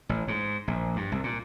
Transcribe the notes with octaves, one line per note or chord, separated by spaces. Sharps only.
A1
G#2
A#1
G2
C2
A#2